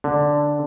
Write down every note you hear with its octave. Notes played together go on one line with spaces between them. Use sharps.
D3